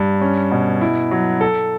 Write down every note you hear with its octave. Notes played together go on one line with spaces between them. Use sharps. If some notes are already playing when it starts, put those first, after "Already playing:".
Already playing: G2
C#4
B2
E4
F#3
A4